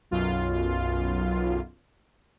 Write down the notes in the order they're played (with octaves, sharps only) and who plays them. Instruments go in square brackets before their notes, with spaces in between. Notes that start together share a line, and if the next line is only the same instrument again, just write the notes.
[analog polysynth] B1 F#2 F4